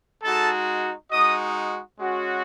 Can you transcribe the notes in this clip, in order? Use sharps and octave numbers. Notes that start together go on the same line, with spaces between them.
G#3 D#4 F#4 A4 A5
G#3 D#4 F#4 D#5 D#6
G#3 C#4 F#4